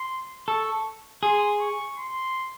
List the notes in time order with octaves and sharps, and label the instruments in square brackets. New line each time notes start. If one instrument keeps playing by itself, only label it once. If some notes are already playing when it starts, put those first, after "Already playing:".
Already playing: [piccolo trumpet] C6
[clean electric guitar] A4 [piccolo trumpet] C#6
[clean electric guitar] G#4 [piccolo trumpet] C6
[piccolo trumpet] C#6
C6